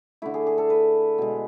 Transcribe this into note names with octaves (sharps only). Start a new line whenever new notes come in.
D3 A3 E4
G#4
G#4
A4
B4
B2 G#3